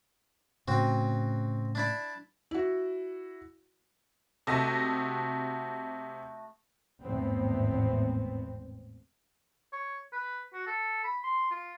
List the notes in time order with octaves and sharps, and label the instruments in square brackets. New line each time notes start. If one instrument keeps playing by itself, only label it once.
[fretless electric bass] A2 C#3 [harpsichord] C4 F#4
[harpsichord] D4 E4 D5
[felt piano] E4 F#4
[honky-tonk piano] C3 A5 [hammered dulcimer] A3 F#4 D#5
[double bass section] G#1 E2 A2 B3 C4
[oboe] C#5
B4
F#4
A4
B5
C6
F4